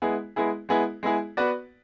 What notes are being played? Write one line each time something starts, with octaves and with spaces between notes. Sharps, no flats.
G#3 B3 E4 G#4
G#3 B3 E4 G#4
G#3 B3 E4 G#4
G#3 B3 E4 G#4
B3 F#4 B4 D5